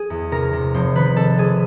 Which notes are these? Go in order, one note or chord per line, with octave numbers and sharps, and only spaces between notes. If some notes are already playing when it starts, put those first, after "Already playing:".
Already playing: G#4
E2
C3 A#4
C3
F1 C5
D#3 B4
C3 A4
C3 G#4